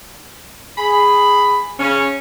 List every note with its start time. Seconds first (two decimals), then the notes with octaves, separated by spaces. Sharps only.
0.78 G#4 B5
1.80 C#3 C#4